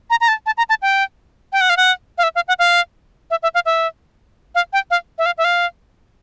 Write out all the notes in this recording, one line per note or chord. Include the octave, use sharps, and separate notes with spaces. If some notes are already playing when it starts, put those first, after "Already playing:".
A#5
A#5
A5
A5
A#5
A5
G5
G5
F#5
F5
F#5
F5
E5
F5
F#5
F5
E5
E5
F5
E5
F5
G5
F5
E5
F5
E5
F5